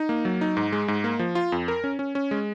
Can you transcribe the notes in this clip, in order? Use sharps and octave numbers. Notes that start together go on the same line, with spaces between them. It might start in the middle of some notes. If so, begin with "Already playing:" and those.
Already playing: D#4
A#3
F#3
D#4
G#2
G#3
G#2
A#3
F3
F4
F2
A#4
C#4
C#4
C#4
G#3